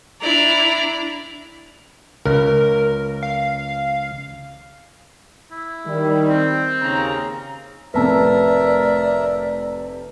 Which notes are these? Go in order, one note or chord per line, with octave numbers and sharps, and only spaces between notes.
D4 E4 D5 A#5
C#2 A#4
F5
E4
D#3 G3
C4
D#2 C#3 A#5
F1 A2 C3 A#4 B4 D5 E5 A5